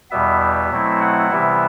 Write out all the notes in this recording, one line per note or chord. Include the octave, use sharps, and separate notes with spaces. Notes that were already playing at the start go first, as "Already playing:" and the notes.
E2 B2 G3 B3 E5
E5
B2 F#3 A3 C4 E4
F#5
C3 E3 G3 B3 E4 E5